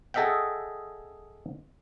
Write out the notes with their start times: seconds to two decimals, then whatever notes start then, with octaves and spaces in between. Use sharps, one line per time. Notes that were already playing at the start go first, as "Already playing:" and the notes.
0.14 G#4 A4 D#5 E5 F#5 G5